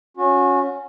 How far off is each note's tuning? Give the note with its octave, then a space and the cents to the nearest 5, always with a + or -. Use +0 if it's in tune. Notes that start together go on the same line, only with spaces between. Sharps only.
C#4 +5 F#4 -30